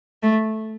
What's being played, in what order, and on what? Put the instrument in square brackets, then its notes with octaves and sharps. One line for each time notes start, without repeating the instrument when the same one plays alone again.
[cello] A3